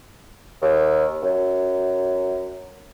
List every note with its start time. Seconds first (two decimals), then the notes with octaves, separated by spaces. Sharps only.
0.62 D#2
1.22 F#2